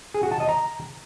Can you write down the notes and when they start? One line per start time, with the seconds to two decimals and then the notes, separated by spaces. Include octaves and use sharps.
0.14 G#4
0.23 F#4
0.32 A5
0.40 D#5
0.49 A#5